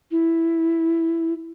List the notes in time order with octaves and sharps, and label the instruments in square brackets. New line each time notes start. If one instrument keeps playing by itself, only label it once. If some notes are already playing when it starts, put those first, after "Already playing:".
[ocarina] E4